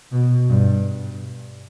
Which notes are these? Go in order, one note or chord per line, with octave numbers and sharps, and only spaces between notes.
B2
G2